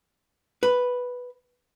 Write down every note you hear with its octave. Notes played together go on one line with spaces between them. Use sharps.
B4